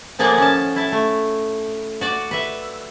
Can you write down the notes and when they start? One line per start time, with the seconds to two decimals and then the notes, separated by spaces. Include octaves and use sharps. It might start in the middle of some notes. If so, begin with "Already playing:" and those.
0.19 A2 F3 A#3 G#4 D5 F#5
0.38 C#4 A5
0.76 E4 A5
0.92 A3
2.01 F#4 D5
2.31 B4 E5